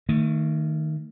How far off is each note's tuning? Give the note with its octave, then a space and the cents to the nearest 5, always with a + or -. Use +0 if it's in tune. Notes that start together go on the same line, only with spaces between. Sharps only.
D#3 -5 A3 +30